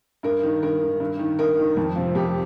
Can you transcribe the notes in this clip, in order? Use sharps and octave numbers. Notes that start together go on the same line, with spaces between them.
G2 A#4
D#3
G2 A#4
D#3
G2
D#3
G2 A#4
D#3
F2
C3 F3
F2 G4